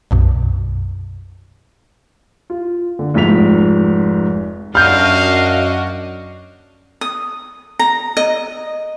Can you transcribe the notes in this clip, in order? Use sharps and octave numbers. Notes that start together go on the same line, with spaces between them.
B1 F#2 B2
F4
D3
F1 G#2 F3 B6 F7
F#2 D4 F#4 D#5 F5 F6 G6
D#6
A#5
D#5